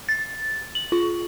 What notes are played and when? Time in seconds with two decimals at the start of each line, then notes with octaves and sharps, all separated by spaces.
0.09 A6
0.75 F#7
0.92 F4